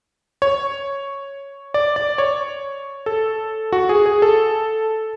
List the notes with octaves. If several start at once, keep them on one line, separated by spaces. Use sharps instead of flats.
C#5
D5
D5
C#5
A4
F#4
G#4
G#4
A4